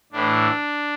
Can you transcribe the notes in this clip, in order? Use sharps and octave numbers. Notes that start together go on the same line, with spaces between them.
A2 E3 D4